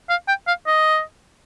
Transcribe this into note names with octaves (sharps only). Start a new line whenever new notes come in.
F5
G5
F5
D#5